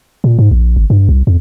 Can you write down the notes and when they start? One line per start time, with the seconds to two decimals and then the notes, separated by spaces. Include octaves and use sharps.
0.24 A#2
0.39 G#2
0.51 A#1
0.76 G#1
0.90 G2
1.09 C2
1.27 F2